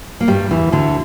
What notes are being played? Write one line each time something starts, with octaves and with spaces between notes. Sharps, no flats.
A#3
G2 G3
E2 E3
D2 D3